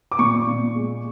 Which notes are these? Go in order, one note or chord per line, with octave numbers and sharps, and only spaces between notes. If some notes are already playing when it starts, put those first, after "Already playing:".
D6
A#2 C#6
A#2
G#3